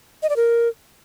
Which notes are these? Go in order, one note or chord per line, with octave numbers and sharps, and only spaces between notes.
D#5
D5
A#4